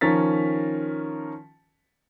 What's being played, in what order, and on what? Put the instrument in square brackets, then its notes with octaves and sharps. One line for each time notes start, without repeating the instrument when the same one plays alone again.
[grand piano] D#3 F3 C#4 A#4 A6 B6